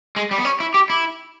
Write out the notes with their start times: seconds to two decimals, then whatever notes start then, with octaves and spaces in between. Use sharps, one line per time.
0.16 G#3
0.31 G3
0.38 B3
0.45 C#4
0.60 E4
0.74 G4
0.90 E4